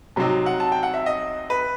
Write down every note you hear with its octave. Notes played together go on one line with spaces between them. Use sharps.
C3 F#3 C4 D#4
F#5
A5
G5
F#5
E5
D#5
B4